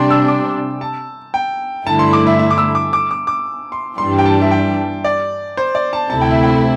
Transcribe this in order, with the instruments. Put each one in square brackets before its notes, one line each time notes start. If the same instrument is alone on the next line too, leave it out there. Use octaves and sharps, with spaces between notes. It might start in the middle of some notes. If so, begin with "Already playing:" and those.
Already playing: [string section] C3 G3 D4 [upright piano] G5 C6
[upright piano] E6
D6
A5
G5
[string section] G2 D3 A3 E4 [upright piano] A5
[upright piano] C6
D6
E5
E5
D6
E6
D6
D6
D6
D6
C6
[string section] G2 E3 G3 D4 G4 [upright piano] C6
[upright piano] G5
A5
E5
G5
D5
C5
D5
A5
[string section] D2 C3 A3 E4 [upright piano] A5
[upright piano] G5
E5
G5